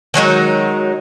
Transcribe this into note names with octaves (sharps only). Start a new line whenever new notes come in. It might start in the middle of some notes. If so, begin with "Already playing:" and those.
D#3 F#3 G#3 D#4